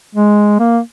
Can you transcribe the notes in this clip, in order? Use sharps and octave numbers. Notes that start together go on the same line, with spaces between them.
G#3
A#3